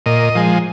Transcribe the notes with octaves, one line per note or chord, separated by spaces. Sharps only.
A#2 D#5
F3 G#3